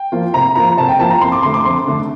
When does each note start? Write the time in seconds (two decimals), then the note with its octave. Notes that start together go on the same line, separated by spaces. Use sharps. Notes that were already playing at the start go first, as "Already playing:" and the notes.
Already playing: G5
0.12 F3 A#3 F4
0.34 C3 A#5
0.55 F3 A#3 F4 A#5
0.77 C3 A5
0.88 G5
0.99 F3 A#3 F4 A5
1.11 A#5
1.21 F2 C6
1.32 D6
1.43 D3 A3 C6
1.54 D6
1.65 F2 C6
1.87 D3 A3